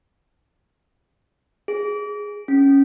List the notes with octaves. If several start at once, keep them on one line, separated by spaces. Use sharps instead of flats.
G#4
C#4